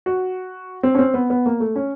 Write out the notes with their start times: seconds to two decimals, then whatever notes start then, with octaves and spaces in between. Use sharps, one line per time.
0.06 F#4
0.83 C4
0.95 C#4
0.99 C4
1.14 B3
1.30 B3
1.46 A#3
1.60 A3
1.76 C#4